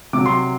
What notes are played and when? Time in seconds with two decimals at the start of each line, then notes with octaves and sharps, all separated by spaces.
0.13 C3 D6
0.17 F#3
0.26 C6